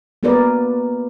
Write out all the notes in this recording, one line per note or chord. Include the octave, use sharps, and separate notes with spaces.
A#3 B3 F#4 A#4 B4 D5